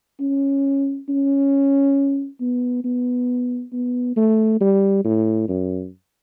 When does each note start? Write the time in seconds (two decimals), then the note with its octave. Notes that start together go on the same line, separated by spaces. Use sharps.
0.21 C#4
1.09 C#4
2.41 B3
2.85 B3
3.73 B3
4.17 A3
4.61 G3
5.05 A2
5.49 F#2